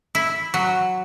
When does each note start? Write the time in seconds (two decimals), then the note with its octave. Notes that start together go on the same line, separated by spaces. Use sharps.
0.15 E4
0.54 F#3